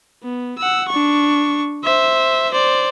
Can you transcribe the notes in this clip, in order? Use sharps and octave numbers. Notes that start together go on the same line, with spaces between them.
B3
F#5 E6
D4 C#6
C5 E5
C5 D5